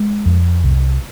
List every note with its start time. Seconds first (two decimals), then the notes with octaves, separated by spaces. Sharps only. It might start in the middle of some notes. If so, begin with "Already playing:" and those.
Already playing: G#3
0.26 F2
0.64 C2